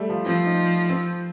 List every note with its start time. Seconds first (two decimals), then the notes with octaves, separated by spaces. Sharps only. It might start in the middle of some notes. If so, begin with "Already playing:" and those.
Already playing: G3 A3
0.09 F3
0.26 F3 C4
0.46 D#4
0.89 C4